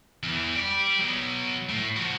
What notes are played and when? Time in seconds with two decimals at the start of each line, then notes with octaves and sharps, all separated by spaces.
0.23 E2 E3
0.55 G4 D5
0.99 F#3 B3
1.69 A2
1.96 F3 F#4